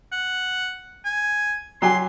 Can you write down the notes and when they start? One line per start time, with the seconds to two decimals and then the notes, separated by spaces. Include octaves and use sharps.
0.12 F#5
1.05 G#5
1.82 F#3 G4 G#5 C6